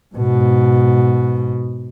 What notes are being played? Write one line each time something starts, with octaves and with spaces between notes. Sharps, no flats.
G#2 B2